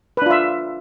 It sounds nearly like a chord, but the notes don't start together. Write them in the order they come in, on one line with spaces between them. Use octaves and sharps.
B4 D4 F4 E5